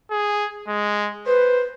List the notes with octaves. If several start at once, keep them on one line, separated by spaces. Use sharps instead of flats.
G#4
G#3
B4 C5